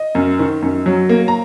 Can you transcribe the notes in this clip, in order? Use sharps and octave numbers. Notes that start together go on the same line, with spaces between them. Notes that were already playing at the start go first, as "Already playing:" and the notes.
Already playing: D#5
F#2
D#3
F#2
F#3
A#3
A#5